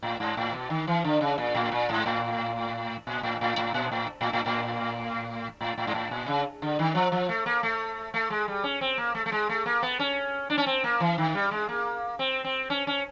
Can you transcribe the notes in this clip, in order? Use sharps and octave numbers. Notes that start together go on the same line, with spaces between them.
A2
G#2
A2
B2
D#3
E3
D3
C#3
A#2
A2
A#2
G#2
A2
A#2
A2
A2
A2
A#2
A2
A2
A2
A2
A2
A2
G#2
A2
A#2
C#3
D3
D#3
F3
F3
A3
A#3
A3
A3
G#3
G3
C#4
C4
A#3
A3
A3
G#3
A3
A#3
B3
C#4
D4
C#4
C4
A#3
E3
D#3
G3
G#3
A#3
C4
C4
C#4
C#4